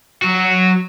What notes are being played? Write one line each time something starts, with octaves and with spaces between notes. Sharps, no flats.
F#3 F#4